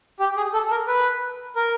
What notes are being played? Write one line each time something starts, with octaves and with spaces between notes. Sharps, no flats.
G4
G#4
A4
A#4
B4
A#4